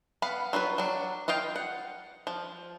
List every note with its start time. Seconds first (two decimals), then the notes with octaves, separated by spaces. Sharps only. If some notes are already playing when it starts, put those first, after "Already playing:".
0.22 B3 F5 B5
0.53 F#3 F4 G#4 B4
0.78 F#3 D4
1.28 F4 D#5 F5 G5
1.56 F#5
2.27 F3